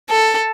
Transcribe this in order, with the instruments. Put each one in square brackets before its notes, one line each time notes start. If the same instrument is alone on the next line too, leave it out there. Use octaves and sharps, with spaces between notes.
[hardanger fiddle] A4